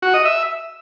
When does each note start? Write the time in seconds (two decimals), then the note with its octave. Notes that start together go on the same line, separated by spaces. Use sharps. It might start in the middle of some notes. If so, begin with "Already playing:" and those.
0.02 F#4
0.14 D#5
0.25 E5